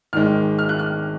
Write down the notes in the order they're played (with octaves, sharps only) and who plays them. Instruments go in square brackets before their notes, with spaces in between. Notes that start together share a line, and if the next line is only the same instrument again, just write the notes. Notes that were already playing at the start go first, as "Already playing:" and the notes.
[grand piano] G#1 G#2 D#3 G#3 F6
F6
F#6
F6